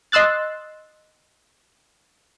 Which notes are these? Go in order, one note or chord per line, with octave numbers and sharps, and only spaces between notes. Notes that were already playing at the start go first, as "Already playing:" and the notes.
D#5 C6 E6 F#6 A6